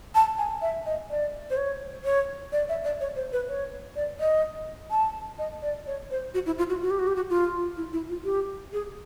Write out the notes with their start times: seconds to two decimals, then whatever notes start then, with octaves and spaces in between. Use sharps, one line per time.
0.15 A5
0.38 G#5
0.62 E5
0.86 D#5
1.10 D5
1.50 C5
1.57 C#5
2.05 C#5
2.52 D5
2.69 E5
2.84 D5
3.01 C#5
3.16 C5
3.33 B4
3.48 C#5
3.96 D5
4.20 D#5
4.91 A5
5.39 D#5
5.62 D5
5.87 C#5
6.11 C5
6.34 F#4
6.46 E4
6.58 F4
6.69 F#4
6.82 F#4
6.90 G4
6.99 F#4
7.07 G4
7.16 F#4
7.30 F4
7.77 E4
7.93 E4
8.09 F4
8.24 G4
8.73 G#4